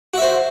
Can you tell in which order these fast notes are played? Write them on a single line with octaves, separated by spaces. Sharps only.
F#4 E5 C5